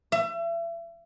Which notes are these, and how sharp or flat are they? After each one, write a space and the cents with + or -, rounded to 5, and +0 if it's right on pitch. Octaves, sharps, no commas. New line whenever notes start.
E5 +35